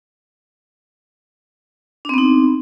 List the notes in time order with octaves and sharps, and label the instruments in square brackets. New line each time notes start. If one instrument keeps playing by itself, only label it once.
[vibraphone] D4
C4
B3
D#4